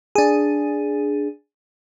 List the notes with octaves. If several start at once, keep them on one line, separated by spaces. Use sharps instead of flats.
D4 G#4